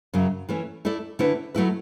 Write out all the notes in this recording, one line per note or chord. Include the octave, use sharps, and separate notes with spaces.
F#2 C#3 F#3
E3 A3 C#4
A3 E4 A4 D5
D3 A3 C#4 E4 B4
F#3 A3 E4 B4